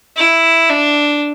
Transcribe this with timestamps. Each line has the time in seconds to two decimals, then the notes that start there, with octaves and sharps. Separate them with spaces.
0.16 E4
0.69 D4